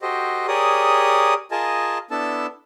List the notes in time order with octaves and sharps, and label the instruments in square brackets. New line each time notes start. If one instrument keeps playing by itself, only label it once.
[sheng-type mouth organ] F#4 G4 A4 C5 D#5
G4 G#4 A#4 C#5 D5 D#6
F4 G#4 A#4 D#5 G#5 A5
B3 D4 E4 A4 A5